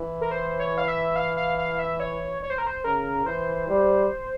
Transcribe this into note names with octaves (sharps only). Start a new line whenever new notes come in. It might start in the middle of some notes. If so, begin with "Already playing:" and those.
Already playing: E3
A#4
C5
C#5
F5
E5
F5
F5
F5
E5
C#5
C#5
C5
A#4
C5
C#3 A#4
E3 C5
G3